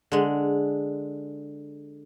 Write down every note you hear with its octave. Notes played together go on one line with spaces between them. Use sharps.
D3 G#3